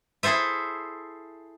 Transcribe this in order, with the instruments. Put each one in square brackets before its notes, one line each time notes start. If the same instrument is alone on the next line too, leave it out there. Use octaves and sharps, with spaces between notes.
[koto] E4 G#4 A4 C5 E5